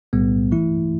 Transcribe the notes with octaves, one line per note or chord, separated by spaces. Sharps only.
B1 A2 G3 B3
E3 A3 E4